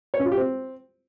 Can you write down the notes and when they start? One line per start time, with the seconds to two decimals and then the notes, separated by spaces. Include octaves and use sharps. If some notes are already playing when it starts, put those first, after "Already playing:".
0.14 C#5
0.20 C#4
0.26 F4
0.32 G4
0.38 C4